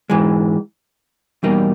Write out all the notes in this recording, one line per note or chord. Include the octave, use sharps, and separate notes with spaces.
G#2 E3 G#3
E2 B2 G3 A#3 D#4